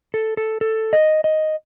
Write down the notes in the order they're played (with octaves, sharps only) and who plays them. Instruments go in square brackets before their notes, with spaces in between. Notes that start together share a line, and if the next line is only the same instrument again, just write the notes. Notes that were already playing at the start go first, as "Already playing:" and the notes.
[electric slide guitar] A4
A4
A4
D#5
D#5